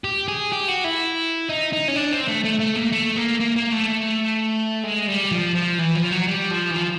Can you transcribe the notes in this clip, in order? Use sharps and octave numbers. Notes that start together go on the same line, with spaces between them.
G4
G#4
G4
F#4
E4
D#4
D#4
C#4
D4
C4
A3
A3
A3
A#3
A3
A#3
A#3
A#3
A3
G#3
G3
F3
F3
E3
F3
F#3
G3
F3
E3
F3